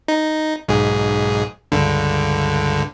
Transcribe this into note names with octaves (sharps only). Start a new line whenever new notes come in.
D#4
B1 G#2 G#4
C#2 G2 D3